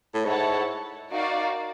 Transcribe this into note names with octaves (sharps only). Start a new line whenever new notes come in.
A2
G#2 E4 A4 C#5 F#5 A5
D#4 F#4 A#4 D5 F5